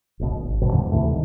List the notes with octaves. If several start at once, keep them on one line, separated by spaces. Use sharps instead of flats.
D#1 A#1 B2
G#1
D2 G2 B2
E2 G#2 D3
D2 C3 E3 A3
G2 D#3